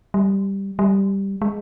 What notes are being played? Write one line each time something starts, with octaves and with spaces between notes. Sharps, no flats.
G3
G3
G#3